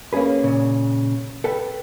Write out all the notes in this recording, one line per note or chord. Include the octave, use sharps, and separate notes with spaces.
A#3 C#4 D4 G#4 B4
A#2 C#3
A4 B4 G5